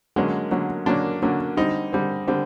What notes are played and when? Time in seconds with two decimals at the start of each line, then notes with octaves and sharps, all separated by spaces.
0.16 D3 F#3 G#3 A#3 C#4 G#4
0.51 D3 F#3 A#3 C#4
0.86 D3 F#3 A#3 C#4 D4
1.22 D3 F#3 A#3 C#4
1.57 D3 G3 C4 D#4
1.93 D3 G3 C4
2.28 D3 G3 C4